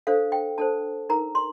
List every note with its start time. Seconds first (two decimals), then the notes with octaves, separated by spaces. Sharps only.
0.07 D4 A4 C5 F5
0.32 G5
0.58 D4 A4 C5 A5
1.09 D#4 A#4 A#5
1.35 C6